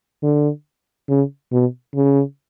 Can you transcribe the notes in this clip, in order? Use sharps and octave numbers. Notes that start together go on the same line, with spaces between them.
D3
C#3
B2
C#3